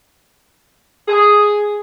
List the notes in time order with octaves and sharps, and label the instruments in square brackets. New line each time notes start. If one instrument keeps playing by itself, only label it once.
[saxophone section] G#4